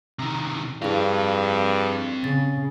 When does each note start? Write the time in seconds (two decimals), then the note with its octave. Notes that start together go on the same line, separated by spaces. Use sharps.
0.19 C3 D#3
0.82 G2 C4 E4 G#4 F5
2.24 C#3 A6